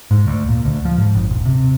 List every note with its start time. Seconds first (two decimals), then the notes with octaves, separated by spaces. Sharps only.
0.11 G#2
0.27 D2
0.49 A#2
0.65 D2
0.85 F3
0.98 G#2
1.15 G1
1.29 D#1
1.46 C3